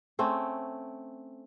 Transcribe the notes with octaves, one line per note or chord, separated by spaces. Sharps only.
A3 C4 C#4